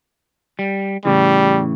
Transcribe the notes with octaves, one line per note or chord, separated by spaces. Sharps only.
G3
A2 C#3 E3 G3